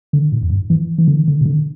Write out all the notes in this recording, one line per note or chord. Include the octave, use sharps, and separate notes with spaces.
D3
A2
E2
G2
E3
E3
D3
D3
B2
D3